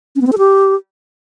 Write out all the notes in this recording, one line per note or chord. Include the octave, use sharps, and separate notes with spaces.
C#4
B3
C4
A4
G4